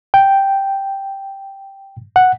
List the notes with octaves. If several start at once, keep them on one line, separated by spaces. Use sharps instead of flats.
G5
F#5